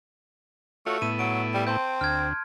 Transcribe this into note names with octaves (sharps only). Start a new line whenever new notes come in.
A3 F4 F#4 C#5
A2 B3 E4 D#7
F#3 D7
G3
C4 A5 C6 G6
D2 F6 G#6